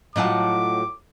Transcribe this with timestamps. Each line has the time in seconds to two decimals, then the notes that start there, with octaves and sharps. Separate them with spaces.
0.16 A2 F#3 D#4 F4 F#5 A5 D6